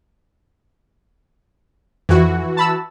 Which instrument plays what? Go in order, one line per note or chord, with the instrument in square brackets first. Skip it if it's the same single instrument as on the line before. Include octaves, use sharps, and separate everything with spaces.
[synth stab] F2 [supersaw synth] E3 F#4
[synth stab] A5 B5 E6